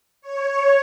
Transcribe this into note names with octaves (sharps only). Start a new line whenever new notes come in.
C#5